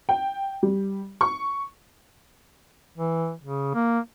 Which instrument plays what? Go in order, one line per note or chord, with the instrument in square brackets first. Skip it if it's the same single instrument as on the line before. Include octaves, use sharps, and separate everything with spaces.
[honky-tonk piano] G5
G3
C#6
[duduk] E3
C#3
A#3